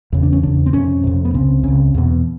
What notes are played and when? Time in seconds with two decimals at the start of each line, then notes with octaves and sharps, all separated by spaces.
0.13 E2 C#3
0.23 D4
0.33 C#4
0.43 E2 C#3 D4
0.66 C4
0.73 F2 C3 C#4
1.03 F2 C3
1.25 B3
1.34 C#2 C#3 C4
1.63 C#2 C#3
1.94 E2 B2